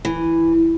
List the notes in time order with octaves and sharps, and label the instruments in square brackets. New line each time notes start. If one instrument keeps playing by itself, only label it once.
[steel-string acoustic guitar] E3